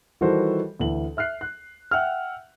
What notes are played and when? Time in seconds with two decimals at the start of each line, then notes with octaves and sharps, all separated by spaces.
0.21 D#3 E3 G3 F#4 A4 C5
0.80 D2 E3 F#7
1.17 E5 F6 F#6 C7
1.41 F#6
1.91 E5 F#5 G5 E6 F6